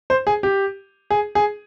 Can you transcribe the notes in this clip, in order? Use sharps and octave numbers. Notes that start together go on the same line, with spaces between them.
C5
G#4
G4
G#4
G#4